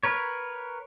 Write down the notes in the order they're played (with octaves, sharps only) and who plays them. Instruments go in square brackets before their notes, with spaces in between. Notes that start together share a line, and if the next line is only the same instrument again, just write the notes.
[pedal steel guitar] A#4 B4 C#5